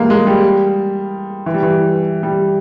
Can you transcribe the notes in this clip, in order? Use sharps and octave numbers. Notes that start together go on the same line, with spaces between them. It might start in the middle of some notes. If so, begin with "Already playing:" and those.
Already playing: E3 G3 G#3 A#3
G#3
G3
E3
G3
E3
G3